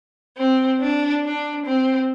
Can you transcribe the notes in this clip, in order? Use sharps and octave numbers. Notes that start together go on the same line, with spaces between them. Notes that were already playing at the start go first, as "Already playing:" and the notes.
C4
D4
D4
C4